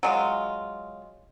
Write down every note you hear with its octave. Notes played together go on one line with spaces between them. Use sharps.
F#3 G#3 F4